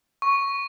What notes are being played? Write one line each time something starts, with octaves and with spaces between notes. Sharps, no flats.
C#6